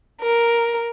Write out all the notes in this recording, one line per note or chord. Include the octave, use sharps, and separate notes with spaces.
A#4